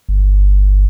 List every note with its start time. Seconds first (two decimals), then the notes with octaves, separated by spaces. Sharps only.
0.09 G1